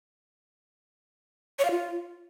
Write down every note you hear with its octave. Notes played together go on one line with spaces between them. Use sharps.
C#5
F5
F4